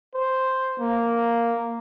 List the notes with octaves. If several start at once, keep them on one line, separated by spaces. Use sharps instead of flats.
C5
A#3